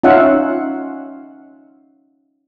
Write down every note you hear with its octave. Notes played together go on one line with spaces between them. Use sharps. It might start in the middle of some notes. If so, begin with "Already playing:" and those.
C#4 D#4 F4 E5 F#5